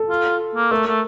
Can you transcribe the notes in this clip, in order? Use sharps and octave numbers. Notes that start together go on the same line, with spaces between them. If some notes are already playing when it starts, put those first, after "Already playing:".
Already playing: A4
F4
A#3
A3 A#4
A3